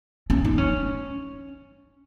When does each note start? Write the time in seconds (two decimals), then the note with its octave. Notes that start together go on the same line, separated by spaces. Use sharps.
0.30 C#4
0.45 D#4
0.58 C#4